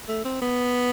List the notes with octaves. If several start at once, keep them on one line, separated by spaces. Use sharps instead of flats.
A3
C4
B3